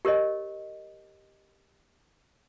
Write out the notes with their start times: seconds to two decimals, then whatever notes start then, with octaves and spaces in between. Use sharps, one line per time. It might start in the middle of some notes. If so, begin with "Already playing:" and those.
0.05 G4 A#4 C#5 D#5